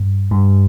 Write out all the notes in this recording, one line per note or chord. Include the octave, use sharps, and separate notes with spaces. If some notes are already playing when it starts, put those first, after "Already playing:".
Already playing: G2
G2